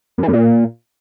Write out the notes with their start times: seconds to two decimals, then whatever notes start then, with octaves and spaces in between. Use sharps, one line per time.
0.18 F#2
0.23 E3
0.28 F#2
0.33 A#2